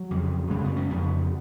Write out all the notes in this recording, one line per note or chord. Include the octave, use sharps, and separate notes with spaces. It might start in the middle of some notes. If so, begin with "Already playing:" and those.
Already playing: F#3
F2 C#3
F#2 C#3 G#3
B3
C#4
F2 C#3 B3